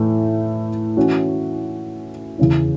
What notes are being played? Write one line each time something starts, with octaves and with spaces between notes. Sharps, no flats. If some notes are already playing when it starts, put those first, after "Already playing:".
Already playing: A2 E3 A3
E3 C#4 F#4
E2 C#3 E3 C#4 E4